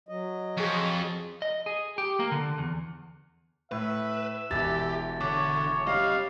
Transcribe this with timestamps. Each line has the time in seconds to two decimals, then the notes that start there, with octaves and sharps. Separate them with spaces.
0.09 F#3 D#5
0.58 F2 G#4 C#6
1.42 D#5
1.66 G#4
1.98 G4
2.20 A#3
2.31 D3
2.58 E2
3.72 A2 B4 E5
4.51 E1 E3 G4 A6
5.21 D3 C#5 D6
5.87 G3 C#4 D#5 F5